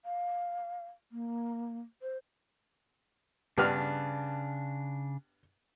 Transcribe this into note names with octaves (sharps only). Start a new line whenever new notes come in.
F5
A#3
C5
G2 C#3 B3 D4 F6